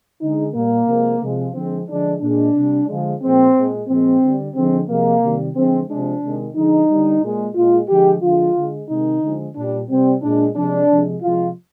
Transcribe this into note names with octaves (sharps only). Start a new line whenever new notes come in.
D3 G#3 D#4
A#2 G3 A#3
C3 F3 G#3
C3 F3 G#3
D3 F3 G#3 C4
D3 F3 G#3 D4
A#2 G#3 D4
C3 G3
D3 F3 G#3
A#2 F3 G#3 C4
A#2 G#3
A#2 F3 G#3 C4
D3 G3
D3 F3 G#3 C4
C3 F3 G#3 A#3
C3 D#3 G3
D3 F3 G#3 C4
C3 F3 G#3 D4
C3 D#3 G#3
D3 F3 G#3 D#4
D3 G3
A#2 G#3
A#2 G#3 F4
D3 F3 G#3 G4
D3 F3 G#3 F4
D3 G#3
C3 D#3 G#3 D#4
D3 F3 G#3
A#2 G3 D4
C3 G3 C4
A#2 G#3 D4
C3 F3 G#3 D4
C3 F3 G#3
C3 F3 G#3 F4